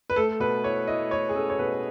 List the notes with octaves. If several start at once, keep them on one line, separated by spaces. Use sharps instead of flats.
B4
A3 A4
B2 B4
E4 C#5
E4 D#5
E4 C#5
G#4
C#4 A4
C#5
B2 B4